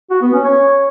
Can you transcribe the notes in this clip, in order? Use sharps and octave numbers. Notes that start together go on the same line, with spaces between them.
F#4
B3
C#4
C#5